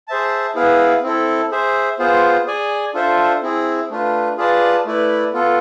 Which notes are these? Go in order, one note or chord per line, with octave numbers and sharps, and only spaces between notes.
G#4 C5 E5 A5
B3 E4 G#4 B4 F5
C4 E4 A4
G#4 C5 E5
B3 F4 G#4 C5
G#4 D5 G#5
D4 F4 A4 C5 E5
C4 E4 G#4
A3 D4 F4 B4
F4 G#4 B4 D5 A5
A3 E4 B4 D5
B3 F4 A4